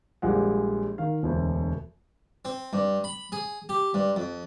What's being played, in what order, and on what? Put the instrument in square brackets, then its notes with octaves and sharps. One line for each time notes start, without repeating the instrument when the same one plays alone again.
[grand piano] A#1 G3 G#3 F#5
D#3 F5
E1 D2
[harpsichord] C4
G2
B5
G#4
G4
G2
F2